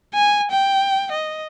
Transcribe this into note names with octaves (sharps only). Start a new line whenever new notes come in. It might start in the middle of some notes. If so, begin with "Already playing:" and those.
G#5
G5
D#5